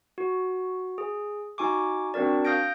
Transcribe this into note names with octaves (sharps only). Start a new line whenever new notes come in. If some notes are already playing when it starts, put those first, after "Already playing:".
F#4
G#4
D#4 F#4 G#5 C#6 D6
C4 D4 F#4 A#4 D5
F5 D#6 F6 G6 A#6 D7